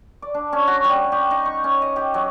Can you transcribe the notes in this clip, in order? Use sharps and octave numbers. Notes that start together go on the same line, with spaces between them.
D5
D4
C#4
F#4
G3
G4
D#4
C#6
C#4
D#5
G4
F#3